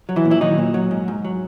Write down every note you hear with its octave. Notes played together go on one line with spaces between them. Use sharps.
F#3
E3 E4
A#2
E4
D#3 F#3 D#4
A#2
F#3
G#2
G#2
F#3